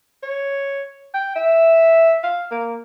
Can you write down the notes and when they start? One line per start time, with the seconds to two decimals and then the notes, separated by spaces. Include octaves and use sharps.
0.23 C#5
1.14 G5
1.36 E5
2.23 F5
2.51 A#3